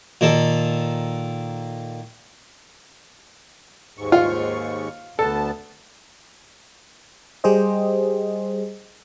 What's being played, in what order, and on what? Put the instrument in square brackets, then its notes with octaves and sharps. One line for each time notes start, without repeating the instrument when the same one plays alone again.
[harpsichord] A#2 D#3 A4
[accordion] D#2 G#2 C#6
[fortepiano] F4
[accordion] D2 B3 A5 [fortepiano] A4
[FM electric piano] G3 G4 G#4 C5 D#5